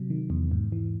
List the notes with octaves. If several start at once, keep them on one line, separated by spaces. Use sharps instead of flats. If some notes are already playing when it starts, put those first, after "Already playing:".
Already playing: C3 F#3
D#3
E2
G#2
E3